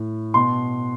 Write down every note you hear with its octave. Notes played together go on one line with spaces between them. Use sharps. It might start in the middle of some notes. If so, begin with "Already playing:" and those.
Already playing: A2
B2 C6